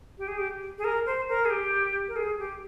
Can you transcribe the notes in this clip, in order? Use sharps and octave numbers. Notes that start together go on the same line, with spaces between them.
G4
G#4
G4
G#4
A#4
C5
A#4
G#4
G4
A#4
G#4
G4